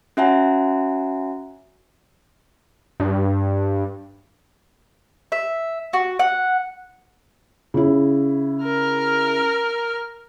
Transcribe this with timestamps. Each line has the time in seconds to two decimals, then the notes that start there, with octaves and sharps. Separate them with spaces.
0.17 C#4 F#4 E5 F#5 G#5 A#5
3.00 G2
5.32 E5
5.93 F#4
6.19 F#5
7.74 C#3 E4
8.63 A#4 F6